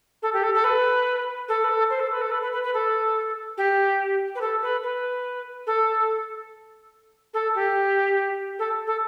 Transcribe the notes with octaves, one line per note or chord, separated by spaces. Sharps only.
A4
G4
A4
A4
B4
A4
B4
A4
C5
A4
B4
A4
B4
B4
B4
B4
A4
G4
B4
A4
B4
B4
A4
A4
G4
A4
A4